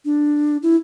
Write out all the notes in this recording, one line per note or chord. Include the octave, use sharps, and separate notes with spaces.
D4
E4